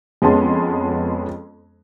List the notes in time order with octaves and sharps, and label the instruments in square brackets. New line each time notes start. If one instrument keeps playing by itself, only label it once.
[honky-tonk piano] F2 G#3 B3 C#4 A5 C6